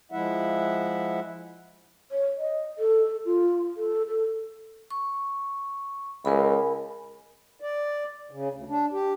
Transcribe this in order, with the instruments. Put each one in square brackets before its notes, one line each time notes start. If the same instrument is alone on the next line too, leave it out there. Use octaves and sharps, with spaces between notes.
[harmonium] F3 G#3 E4 E5 F#5
[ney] C#5
D#5
A4
F4
A4
A4
[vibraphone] C#6
[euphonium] C#2 [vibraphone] A#4 G#5 B5
[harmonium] D5
C#3
D2
D4
G4